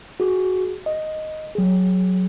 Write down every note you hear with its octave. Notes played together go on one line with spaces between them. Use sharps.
F#4 G#4
D#5
F#3 G#4